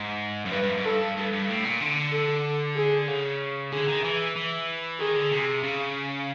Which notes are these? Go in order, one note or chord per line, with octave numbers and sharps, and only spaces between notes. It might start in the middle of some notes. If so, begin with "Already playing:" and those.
Already playing: G#2
F#2
G2 B4
G2
F#2
G#2
G2 A4
G2
G2
A2
A#2
D3
A4
G#4
C#3
D3 G#4
D#3
E3
E3
D#3 G#4
D3
C3
C#3